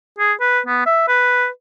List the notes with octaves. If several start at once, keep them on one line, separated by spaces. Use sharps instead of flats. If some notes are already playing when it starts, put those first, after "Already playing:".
G#4
B4
B3
E5
B4